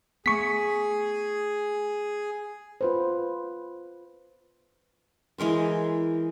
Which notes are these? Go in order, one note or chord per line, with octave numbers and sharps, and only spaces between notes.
A3 B3 G#4 C#6 B6
F4 B4 C5
E3 G#3 A#4 C5